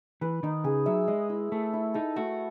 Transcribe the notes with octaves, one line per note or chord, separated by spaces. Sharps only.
E3 B4
D#3 D#4
C#3 G#4
F#3 E5
G#3 D#5
E4
A3 A4
E4
D#4 A4
A3 F#4